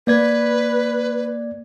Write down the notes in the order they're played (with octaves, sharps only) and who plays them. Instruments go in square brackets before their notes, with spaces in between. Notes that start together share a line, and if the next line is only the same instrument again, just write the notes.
[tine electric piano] A#3 D5 G#6 [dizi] B4